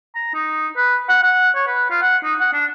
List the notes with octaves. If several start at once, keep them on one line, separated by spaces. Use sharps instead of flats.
A#5
D#4
B4
F#5
F#5
C#5
B4
F4
F#5
D#4
F#5
D4